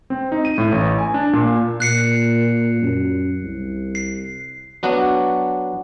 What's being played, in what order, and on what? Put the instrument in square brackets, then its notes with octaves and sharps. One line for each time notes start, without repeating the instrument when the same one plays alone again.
[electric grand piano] C4
D#4
D#7
A2
A1
G#5
D4
A#2
[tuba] A#2 [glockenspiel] F#6 C7 C#7
[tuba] F#2
C2
[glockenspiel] C7
[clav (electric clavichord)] F#3 B3 D4 F#4